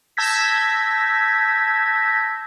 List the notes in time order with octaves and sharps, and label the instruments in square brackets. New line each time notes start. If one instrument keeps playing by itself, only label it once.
[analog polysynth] A5 E6 G6 G#6 A#6 B6